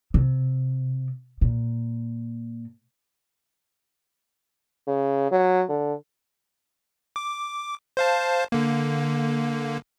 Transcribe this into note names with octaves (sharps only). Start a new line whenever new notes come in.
C3
A#2
C#3
F#3
D3
D6
C5 F5 A5
D3 A#3